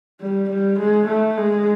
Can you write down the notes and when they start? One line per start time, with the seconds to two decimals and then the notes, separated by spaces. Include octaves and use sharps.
0.21 G3
0.50 G3
0.80 G#3
1.08 A3
1.37 G#3